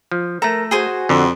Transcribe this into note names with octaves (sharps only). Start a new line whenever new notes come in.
F3
A3 A4 A#4 A#5
F#4 G#4 C5 G#5
F2 D3